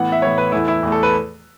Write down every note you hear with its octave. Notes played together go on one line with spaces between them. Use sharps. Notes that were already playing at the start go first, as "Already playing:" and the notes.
Already playing: A2 E3 B3 F#5
E5
A2 E3 B3 C#5
B4
E2 E3 A3 E4
E4
E2 E3 A3
A4
B4